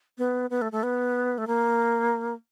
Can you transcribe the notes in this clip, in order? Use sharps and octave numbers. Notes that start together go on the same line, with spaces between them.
B3
B3
A3
A3
B3
A3
A#3